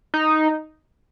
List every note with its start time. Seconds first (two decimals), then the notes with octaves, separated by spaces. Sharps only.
0.14 D#4